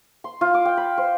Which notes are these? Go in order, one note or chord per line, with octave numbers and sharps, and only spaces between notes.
C6
F4
D6
G5
B5
C5